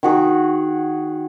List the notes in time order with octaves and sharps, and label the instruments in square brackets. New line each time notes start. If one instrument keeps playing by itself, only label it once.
[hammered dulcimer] D#3 F#4 G#4